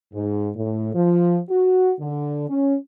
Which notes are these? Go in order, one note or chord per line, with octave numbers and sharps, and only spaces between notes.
G#2
A2
F3
F#4
D3
C#4